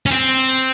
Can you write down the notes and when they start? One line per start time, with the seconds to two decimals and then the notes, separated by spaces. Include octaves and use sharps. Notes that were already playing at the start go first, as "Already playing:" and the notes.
0.06 C#4
0.11 C4